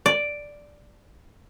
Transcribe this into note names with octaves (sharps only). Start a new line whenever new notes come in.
D5